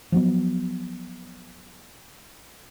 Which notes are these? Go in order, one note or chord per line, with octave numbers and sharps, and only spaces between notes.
F3 F#3 B3